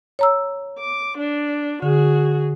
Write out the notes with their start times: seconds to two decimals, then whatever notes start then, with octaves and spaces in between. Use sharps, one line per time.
0.19 C#5 A#5 E6
0.79 D6
1.18 D4
1.82 D3 F#4 G#4